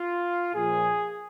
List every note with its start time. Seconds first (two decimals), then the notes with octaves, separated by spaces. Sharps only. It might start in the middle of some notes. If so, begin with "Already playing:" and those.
Already playing: F4
0.55 A#2 F3 G#4